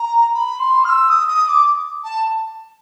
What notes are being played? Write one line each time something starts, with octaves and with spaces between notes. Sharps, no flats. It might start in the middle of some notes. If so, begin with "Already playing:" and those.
Already playing: A#5
B5
C6
F6
E6
D#6
D#6
D6
A5